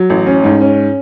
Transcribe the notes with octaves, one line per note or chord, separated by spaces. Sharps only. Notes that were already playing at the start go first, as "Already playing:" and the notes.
Already playing: F#3
A1
C#4
G#2
C#4